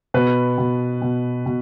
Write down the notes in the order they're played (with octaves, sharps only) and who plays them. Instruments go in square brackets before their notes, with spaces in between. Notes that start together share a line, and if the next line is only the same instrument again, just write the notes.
[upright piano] B2 B4
B2
B2
B2